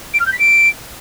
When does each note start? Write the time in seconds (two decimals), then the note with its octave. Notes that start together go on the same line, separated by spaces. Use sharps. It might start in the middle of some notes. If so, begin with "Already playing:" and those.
0.13 D7
0.20 F6
0.26 G6
0.32 B6
0.39 D7